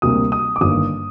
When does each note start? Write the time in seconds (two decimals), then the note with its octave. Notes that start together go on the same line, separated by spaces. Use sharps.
0.02 D2 C3 G3 A#3 D#6
0.32 D#6
0.56 D6
0.61 G1 G2 D#3 A#3 D#6